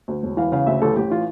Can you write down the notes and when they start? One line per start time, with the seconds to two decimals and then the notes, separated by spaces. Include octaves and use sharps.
0.08 D2
0.23 E1
0.37 E3 F5
0.52 C#3 F5
0.66 D2 E5
0.82 A1 A4
0.96 A1 G4
1.11 E3 F4